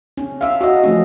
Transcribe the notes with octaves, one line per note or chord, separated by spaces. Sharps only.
C#4
E5 F5
F#4 D#5
F3 A3 C#4